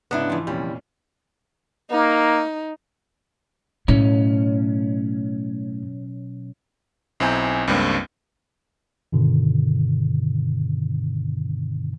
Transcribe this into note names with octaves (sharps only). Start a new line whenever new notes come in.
G#2 C#3 B3 D4 E4
E3 F3
F1 A#2 G3 C#4
A#3 D#4
B1 A2 C#4
B1 C4 E4 G#5 A#5 G6
C#2 G2 G3 A#3 C4 D4
G2 B2 D3 D#3